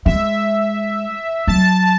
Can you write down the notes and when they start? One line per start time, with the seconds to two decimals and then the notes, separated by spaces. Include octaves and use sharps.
0.05 G#3 E5
1.47 F#3 A5